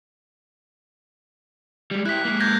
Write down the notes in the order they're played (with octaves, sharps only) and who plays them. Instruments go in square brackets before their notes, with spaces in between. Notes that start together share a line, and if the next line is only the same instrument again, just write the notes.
[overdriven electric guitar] G3 G#3
[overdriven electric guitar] E4 G4 [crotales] F#6 B6
[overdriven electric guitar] G#3 A#3
[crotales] G6 G#6 A#6